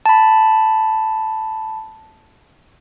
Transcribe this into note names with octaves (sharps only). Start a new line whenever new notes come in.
A5 B5